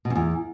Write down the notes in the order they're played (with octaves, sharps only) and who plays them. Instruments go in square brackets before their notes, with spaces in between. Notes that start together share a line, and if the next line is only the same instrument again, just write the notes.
[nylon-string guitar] B2
F#2
E2